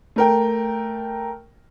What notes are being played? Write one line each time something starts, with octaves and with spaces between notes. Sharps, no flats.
A3 A#4 G5